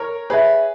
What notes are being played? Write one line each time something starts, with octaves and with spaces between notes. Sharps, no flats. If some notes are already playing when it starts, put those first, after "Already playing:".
Already playing: A#4 C#5
G#4 B4 C#5 E5